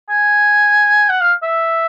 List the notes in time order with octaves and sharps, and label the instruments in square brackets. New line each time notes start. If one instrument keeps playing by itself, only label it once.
[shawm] G#5
F#5
F5
E5